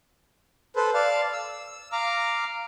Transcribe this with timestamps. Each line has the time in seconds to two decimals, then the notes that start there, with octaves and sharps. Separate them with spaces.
0.76 A4 B4 C5
0.94 D5 F5 A5
1.33 E6
1.92 F5 A#5 D6 F6